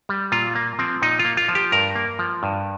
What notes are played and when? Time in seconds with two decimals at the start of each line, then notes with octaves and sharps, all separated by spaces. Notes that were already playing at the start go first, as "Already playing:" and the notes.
0.09 G3
0.32 A#2 F4
0.55 A#3
0.79 F3 C4
1.02 A#2 D#4
1.19 F4
1.25 A#3
1.37 F4
1.48 F3
1.55 G4
1.72 G2 A#4
1.95 A#3
2.19 F3
2.43 G2